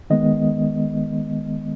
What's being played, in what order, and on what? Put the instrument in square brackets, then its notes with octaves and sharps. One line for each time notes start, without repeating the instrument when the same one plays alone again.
[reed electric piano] D#3 G#3 B3 D#5